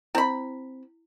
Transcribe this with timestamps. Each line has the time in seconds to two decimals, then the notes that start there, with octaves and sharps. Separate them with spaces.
0.15 C4 E4 B5